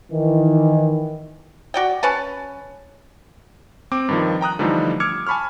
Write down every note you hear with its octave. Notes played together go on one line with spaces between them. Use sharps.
D#3 E3
F#4 D5 G5
C#4 B4 A5
C4 D6
G2 D#3 F3
G5 A#5 D#6 F#6
D3 E3 F3 G3 A3 D#4
D6 E6 F6 G#6 C#7
G#5 A5 B5 C#6 F6